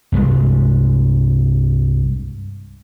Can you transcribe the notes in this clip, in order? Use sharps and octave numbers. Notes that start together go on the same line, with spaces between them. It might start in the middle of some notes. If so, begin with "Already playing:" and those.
C2 G2 G3 G#3